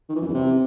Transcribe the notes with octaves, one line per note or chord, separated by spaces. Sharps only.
D#3
E3
F#2
E2
C3